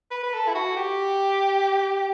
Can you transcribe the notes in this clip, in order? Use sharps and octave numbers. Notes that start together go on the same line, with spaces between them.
B4
B4
A4
E4
F#4
G4